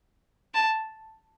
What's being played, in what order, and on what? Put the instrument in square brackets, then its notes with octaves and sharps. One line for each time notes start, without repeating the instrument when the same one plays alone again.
[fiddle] A5